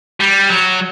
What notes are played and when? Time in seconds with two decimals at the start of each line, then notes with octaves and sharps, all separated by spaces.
0.20 G3
0.50 F#3